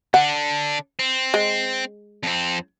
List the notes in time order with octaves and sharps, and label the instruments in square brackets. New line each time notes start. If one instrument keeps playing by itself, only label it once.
[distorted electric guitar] D3 D4 [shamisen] F#5
[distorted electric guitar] C4
[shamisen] G#3
[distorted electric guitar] F2 C4